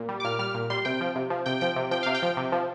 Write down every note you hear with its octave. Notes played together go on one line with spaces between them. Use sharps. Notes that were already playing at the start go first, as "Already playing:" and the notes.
Already playing: A#2
G3
D6
A#2 F6
G3 F6
A#2
G3 C6
C3 G5
F3
C3
F3
C3 G5
F3 G5
C3
F3 G5
C3 F5
G5
F3
C3
F3